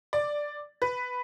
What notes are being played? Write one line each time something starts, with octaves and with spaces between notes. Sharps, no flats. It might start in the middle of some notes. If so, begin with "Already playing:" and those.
D5
B4